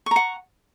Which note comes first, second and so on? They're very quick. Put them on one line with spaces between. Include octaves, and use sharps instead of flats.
C#6 A#5 F#5